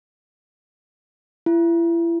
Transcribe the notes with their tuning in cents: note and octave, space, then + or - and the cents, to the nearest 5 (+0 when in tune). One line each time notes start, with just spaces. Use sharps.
E4 +35